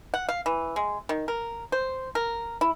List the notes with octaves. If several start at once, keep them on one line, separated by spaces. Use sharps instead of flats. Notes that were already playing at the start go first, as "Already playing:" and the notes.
F#5
F5
E3
G#3
D#3
A#4
C5
A#4
E4